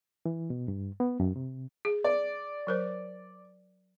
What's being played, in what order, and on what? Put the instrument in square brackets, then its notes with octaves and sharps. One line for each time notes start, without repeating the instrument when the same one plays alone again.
[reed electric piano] E3
B2
G2
B3
F#2
C3
[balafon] G#4
[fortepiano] D5
[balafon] F#3 A#4 C5